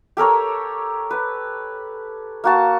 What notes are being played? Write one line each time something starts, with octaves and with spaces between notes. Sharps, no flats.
G4 A4 A#4 C#5
B4
A#3 F#4 A5